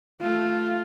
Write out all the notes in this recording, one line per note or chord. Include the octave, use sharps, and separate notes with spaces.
A3 F4